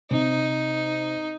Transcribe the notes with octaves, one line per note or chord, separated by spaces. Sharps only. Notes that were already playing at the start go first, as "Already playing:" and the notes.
C3 D#4